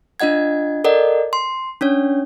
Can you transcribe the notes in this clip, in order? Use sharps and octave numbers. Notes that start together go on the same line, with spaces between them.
D4 F4 D#5 F#5 G#6
A4 A#4 D5 D#5 F#5
C6
C#4 D4 C#5